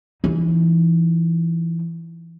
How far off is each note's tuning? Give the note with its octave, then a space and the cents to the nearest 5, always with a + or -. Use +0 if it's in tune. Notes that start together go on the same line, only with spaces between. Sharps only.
E3 +20 D#4 +0